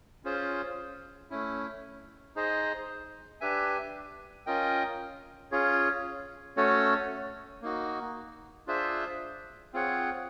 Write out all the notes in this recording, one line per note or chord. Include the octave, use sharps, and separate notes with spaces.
C#4 F4 G#4 C5
A3 C#4 E4
D#4 G#4 C5 D#5
D4 G4 B4 E5 G#5
C#4 F4 A#4 D#5 G5
C#4 F4 G#4 C#5
A3 C#4 F#4 A4 C#5
A#3 D#4 F#4
D4 F4 G#4 C5 E5
C4 F4 G#4 C#5 F#5